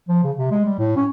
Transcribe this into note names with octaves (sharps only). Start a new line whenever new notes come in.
F3
C#3
C3
G#3
G3
A2
C#4